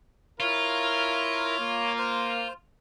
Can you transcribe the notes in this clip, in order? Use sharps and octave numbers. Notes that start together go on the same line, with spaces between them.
E4 F4 A#4 C#5
A#3
C5